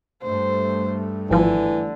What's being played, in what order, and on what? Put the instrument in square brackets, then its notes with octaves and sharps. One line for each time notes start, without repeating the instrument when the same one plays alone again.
[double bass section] G2 A3 [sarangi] C5
[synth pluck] G#1 F3 [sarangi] D3 [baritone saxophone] E3